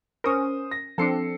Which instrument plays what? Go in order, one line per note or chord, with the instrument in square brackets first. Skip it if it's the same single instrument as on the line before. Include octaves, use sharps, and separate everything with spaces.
[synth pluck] C#4 A#4 [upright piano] C5 D#6
[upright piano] A#6
[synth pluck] F3 C4 D4 [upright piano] A4 C7 C#7